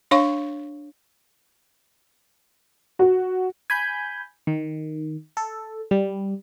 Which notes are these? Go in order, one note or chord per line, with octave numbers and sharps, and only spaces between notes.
D4 C#5 F5 C#6
F#4
G#5 B5 G6
D#3
A4
G3